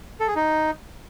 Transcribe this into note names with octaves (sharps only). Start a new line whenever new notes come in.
A4
G#4
D#4